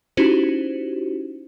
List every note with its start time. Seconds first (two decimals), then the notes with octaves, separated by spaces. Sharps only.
0.17 C#4 D#4 E4 F#4 G4 C5